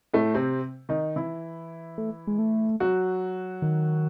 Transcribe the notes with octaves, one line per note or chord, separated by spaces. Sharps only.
A2 A3
C3 C4
D#3 D#4
E3 E4
A3
G#3
A3
F#3 F#4
D#3